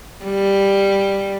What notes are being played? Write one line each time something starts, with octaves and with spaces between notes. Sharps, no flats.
G3